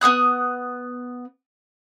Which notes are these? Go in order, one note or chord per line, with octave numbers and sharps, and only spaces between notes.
B3 F#4 D#6 F#6